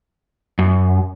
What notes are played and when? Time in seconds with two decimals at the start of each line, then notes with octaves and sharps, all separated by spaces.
0.59 F#2